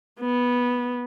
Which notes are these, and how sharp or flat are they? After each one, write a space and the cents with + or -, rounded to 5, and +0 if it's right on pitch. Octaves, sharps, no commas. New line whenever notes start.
B3 -10